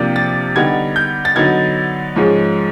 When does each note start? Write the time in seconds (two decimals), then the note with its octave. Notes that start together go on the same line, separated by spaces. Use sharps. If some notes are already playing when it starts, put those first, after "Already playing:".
Already playing: C3 F3 A#3 D4
0.16 A6
0.56 D3 G3 B3 D#4 G#6
0.96 G6
1.25 A6
1.36 D3 F#3 B3 D#4 G#6
2.16 G#2 F3 G#3 C#4